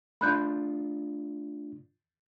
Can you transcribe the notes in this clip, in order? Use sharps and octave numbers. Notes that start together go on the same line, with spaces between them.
A3 D4 F4 B5 F#6 G6